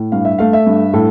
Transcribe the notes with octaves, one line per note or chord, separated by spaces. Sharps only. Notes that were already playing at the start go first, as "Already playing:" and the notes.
Already playing: A2
G2 F5
E5
A3 F5
E5
G2
A2 A4